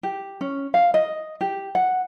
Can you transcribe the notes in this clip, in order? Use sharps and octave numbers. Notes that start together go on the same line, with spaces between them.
G4
C#4
F5
D#5
G4
F#5